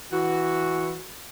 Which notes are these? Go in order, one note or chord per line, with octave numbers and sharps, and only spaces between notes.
E3 F#4